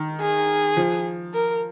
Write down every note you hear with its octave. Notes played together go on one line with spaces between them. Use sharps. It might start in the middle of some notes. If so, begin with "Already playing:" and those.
Already playing: D#3
G#4
F3
A#4